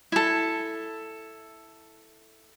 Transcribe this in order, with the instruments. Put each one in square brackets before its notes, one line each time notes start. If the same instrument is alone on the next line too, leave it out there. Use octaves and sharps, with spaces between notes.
[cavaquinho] E4 A4